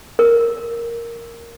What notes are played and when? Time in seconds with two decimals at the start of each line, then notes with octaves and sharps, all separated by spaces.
0.19 A#4